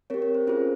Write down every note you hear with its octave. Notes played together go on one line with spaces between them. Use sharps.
C4 G4 A#4 C#5
A#4
C5
C#4 F4 G#4 C5